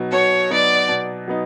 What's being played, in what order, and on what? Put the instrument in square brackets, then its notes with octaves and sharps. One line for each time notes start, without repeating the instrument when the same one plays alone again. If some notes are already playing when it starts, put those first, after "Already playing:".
Already playing: [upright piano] B2 F#3 B3 D#4
[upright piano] B2 [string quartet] C#5
[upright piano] F#3 B3 D#4 [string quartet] D5
[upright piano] B2
F#3 B3 D#4